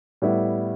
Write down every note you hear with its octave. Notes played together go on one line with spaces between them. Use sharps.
A2 G3 B3 E4